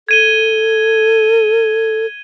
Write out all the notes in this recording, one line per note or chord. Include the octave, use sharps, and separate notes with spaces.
A4 G#6 D#7 G7